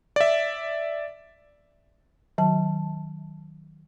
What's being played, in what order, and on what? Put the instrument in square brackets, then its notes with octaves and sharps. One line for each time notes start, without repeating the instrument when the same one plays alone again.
[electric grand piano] D5 E5
[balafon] D#3 F#3 A5